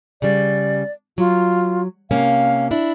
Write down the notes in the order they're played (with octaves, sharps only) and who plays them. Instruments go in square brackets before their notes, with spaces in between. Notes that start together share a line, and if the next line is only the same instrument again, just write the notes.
[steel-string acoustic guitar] C#3 G3 [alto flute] D5
[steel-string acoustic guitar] F#3 [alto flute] F4
[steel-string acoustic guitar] C3 A#3 C#4 [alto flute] F5
[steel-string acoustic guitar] D4 E4